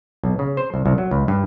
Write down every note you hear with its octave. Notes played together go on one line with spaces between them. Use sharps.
B1
C#3
C5
C2
C2
F#3
C#2
G2